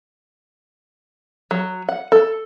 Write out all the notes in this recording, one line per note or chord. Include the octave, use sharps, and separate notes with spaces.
F#3
F#5
A4